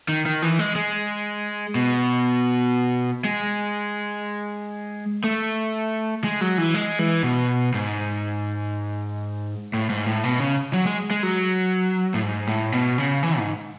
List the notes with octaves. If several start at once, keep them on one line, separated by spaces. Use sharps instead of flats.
D#3
D#3
E3
G#3
G#3
B2
G#3
A3
G#3
F#3
E3
G#3
E3
B2
G#2
A2
G#2
A2
B2
C#3
F#3
G#3
G#3
F#3
A2
G#2
A2
B2
C#3
E3
G#2